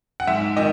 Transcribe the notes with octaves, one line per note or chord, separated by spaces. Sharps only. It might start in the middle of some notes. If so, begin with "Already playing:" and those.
F#5
G#2 E5
D#3 D#5